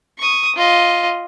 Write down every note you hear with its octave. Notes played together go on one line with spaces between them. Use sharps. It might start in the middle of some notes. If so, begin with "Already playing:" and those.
C#6 D#6
F4 D#5